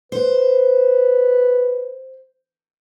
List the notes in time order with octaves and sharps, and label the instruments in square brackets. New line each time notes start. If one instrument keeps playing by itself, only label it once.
[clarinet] B4 [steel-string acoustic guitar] C5